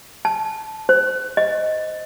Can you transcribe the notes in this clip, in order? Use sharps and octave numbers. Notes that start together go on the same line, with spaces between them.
A5
C5
D#5